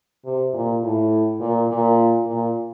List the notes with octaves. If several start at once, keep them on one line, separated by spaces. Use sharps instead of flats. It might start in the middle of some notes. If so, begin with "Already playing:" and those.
C3
A#2
A2
A#2
A#2
A#2